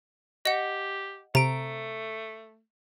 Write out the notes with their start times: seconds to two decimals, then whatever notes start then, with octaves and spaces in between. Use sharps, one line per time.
0.45 G4 D#5 F#5
1.35 C3 A3 A#5 D7